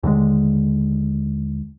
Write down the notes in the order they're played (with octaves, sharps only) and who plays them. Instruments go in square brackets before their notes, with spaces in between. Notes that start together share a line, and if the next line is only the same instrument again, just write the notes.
[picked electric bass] D#2 D3 E3 G#3